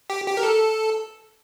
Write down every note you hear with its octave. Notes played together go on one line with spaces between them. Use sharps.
G4
G4
A#4
A4